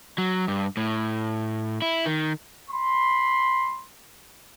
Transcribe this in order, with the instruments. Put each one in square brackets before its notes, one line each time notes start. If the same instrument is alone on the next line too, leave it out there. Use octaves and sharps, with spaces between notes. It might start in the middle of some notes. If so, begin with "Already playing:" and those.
[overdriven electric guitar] F#3
G2
A2
E4
D#3
[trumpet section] B5 C6